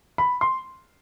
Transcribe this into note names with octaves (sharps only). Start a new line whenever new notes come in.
B5
C6